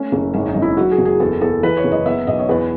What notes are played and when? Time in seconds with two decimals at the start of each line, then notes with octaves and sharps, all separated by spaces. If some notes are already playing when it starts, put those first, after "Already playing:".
Already playing: A3 C#4
0.12 F#1
0.34 G#1 C#4
0.48 D#4
0.55 G#1
0.62 E4
0.77 F#3 F#4
0.91 G#4
0.98 F#1
1.05 G#4
1.20 E2 A4
1.41 E2 A4
1.63 E3 B4
1.77 C#5
1.84 F#1
1.92 D#5
2.06 B3 E5
2.27 B1 D#5
2.39 C#5
2.49 E2 B4